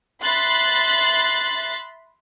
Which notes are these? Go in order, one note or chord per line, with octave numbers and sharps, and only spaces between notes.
E5 B5 C6 F#6 A6 C7